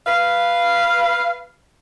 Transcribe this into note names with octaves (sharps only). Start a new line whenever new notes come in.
B4 F5